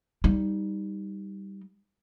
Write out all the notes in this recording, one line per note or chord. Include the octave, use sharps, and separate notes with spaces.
G3 D#4